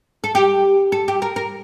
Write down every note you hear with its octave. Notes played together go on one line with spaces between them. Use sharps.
A4
G4
A4
G4
A#4
A#4